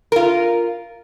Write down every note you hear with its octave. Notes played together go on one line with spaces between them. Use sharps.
F4 A#4